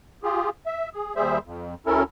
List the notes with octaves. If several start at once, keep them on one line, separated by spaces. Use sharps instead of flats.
F4 G4 G#4
E5
G#4
D#2 G3 G#4 C5 E5
F2
D2 C#4 E4 A4 A#4